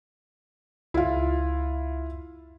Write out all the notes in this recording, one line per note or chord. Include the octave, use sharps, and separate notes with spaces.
C#2 E4 F4